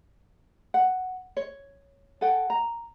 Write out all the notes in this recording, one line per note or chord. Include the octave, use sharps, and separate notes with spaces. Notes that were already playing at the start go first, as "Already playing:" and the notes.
F#5
C#5
A4 F#5 G5
A#5